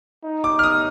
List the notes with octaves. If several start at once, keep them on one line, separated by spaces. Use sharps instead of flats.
D#4
D6
F6
D#6